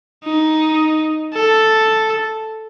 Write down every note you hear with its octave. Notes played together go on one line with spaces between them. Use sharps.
D#4
A4